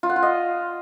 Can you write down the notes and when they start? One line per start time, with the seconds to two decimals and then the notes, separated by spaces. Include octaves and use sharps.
0.03 F4
0.10 F#5
0.16 F4
0.23 D#5